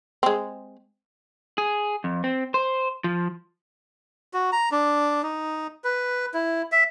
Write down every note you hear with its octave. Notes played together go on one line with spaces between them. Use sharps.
G#3 C4
G#4
F2
C4
C5
F3
F#4
A#5
D4
D#4
B4
E4
E5